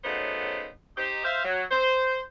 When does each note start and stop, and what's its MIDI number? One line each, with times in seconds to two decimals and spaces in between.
0.04 0.68 49
0.04 0.68 54
0.04 0.68 57
0.04 0.68 59
0.04 0.68 63
0.04 0.68 72
0.97 1.20 63
0.97 1.20 67
0.97 1.20 72
1.24 1.41 72
1.24 1.41 76
1.24 1.41 77
1.45 1.63 54
1.71 2.20 72